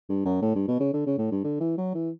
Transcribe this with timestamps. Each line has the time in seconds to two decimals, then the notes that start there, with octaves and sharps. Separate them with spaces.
0.09 G2
0.25 F#2
0.42 A2
0.55 G2
0.68 B2
0.80 C#3
0.93 D3
1.06 C#3
1.18 A2
1.31 G2
1.44 D3
1.60 E3
1.78 F#3
1.95 E3